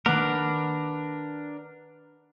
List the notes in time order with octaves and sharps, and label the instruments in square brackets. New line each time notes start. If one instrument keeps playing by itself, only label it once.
[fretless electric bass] D#3 A#3 [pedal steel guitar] D4 A#4 [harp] B4 F#5 D6